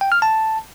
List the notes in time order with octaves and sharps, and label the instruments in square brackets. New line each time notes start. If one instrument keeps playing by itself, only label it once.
[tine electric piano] G5
F6
A5